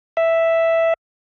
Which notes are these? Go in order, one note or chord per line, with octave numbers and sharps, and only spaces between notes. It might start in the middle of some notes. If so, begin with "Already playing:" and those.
E5